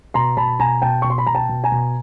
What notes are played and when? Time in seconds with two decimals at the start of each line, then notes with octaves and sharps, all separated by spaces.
0.14 B2 A#5 C6
0.37 B2 A5 B5
0.60 B2 G#5 A#5
0.82 B2 G5 A5
1.02 B2 C#6
1.10 C6
1.18 B5
1.26 B2 A#5
1.35 G5 A5
1.49 B2
1.64 G#5 A#5
1.72 B2